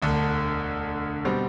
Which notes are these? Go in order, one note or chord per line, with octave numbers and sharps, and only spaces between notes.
E1 D2 D3
B2 G3 C4